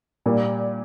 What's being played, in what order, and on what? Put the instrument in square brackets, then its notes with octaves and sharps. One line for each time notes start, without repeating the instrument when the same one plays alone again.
[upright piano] A#2 G3 A#3